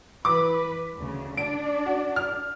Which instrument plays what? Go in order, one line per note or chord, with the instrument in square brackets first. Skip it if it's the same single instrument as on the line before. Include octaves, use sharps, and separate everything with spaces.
[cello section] E3 B4 [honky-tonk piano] D6
[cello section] D2 C#3
[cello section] D4 D5 [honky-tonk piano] D7
[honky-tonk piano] F#4
F6